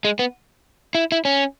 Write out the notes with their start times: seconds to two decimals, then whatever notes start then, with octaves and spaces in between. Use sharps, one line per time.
0.05 G#3
0.19 B3
0.95 E4
1.12 E4
1.25 C#4